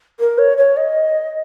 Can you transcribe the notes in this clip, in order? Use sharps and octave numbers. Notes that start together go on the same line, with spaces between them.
A#4
C#5
C#5
D#5